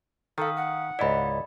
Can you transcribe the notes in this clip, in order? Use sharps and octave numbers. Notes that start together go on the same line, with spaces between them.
D#3 A4 F5 D#6
F#5
C#2 G#2 E4 D5 D#5 B5